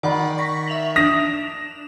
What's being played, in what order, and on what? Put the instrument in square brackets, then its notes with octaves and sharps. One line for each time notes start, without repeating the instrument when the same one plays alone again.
[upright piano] D#3 [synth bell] D5 F#5 B5
[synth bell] C#6 A#6 B6
E5 F7 F#7
[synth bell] D4 E7 F7 [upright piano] D#6 A#6